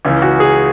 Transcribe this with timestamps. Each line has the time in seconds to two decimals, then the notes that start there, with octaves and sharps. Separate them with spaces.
0.05 C#2 C#3 E3
0.22 F#4
0.40 G#4